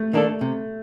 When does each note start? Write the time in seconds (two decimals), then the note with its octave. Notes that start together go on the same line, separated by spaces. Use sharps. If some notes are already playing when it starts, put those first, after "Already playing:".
Already playing: A3
0.13 D#3 A#3 D4 A4
0.41 C3